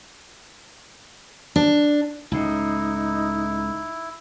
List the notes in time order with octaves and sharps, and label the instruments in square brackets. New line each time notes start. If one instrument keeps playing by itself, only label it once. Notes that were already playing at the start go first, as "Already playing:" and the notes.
[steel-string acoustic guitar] D4
[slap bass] C#2 A2 [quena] D#4 [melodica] E4